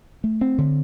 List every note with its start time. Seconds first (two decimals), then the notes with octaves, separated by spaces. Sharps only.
0.24 A3
0.41 C4
0.58 D3